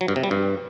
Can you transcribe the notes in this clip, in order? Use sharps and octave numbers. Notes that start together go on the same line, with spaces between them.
F#3
G2
C3
G3
G2